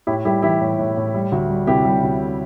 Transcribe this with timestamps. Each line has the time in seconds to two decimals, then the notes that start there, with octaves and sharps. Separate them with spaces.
0.07 A2 E4 G4
0.25 G3 E4 G4
0.42 E3 E4 G4
0.61 A2
0.79 A2
0.97 A2
1.14 G3
1.32 D2
1.50 G3
1.67 C3 E4 G4
1.85 G3
2.03 D2